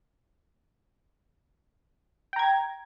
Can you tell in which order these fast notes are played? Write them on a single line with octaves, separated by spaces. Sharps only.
G5 A#5 G#6